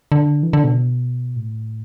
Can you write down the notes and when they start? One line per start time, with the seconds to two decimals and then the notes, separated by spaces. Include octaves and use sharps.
0.12 D3
0.43 E3
0.53 D3
0.64 B2
1.36 A2